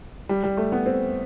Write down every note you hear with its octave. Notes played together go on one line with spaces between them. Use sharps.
G3
G3
A3
B3
C4